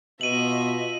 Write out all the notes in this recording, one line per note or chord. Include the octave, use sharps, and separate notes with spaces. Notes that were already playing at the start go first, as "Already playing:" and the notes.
B2 F4 D#5 E5 D#7 F#7